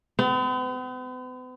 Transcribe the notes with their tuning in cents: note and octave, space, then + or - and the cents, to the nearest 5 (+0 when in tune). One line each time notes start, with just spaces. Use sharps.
B3 +45